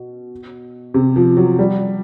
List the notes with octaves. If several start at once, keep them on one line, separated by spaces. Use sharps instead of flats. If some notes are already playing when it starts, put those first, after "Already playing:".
Already playing: B2
C3
F3
F#3
G3